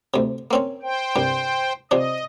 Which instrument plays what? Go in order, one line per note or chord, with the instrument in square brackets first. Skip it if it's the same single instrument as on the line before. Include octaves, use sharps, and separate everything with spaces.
[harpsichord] D2 C3
A#3 C4 C#4
[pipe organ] C5 G5
[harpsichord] C2 G2
[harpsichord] C3 F3 D4 [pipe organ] D#5